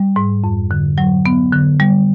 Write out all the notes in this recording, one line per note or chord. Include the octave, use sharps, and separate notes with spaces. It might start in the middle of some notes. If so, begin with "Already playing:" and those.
Already playing: G3
G#2
F2
D3
F#3
B3
D3
G3